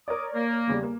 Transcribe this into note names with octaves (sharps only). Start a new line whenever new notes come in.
A#4 C#5 D5 D6 D#6
A#3
E2 C#3 G3
A#3